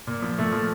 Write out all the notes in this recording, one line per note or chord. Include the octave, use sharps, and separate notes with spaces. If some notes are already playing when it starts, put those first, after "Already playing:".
A#2
F3
A#2 A3
F3